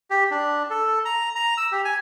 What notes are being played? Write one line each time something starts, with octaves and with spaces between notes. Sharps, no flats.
G4
D4
A4
A#5
A#5
E6
G4
G#5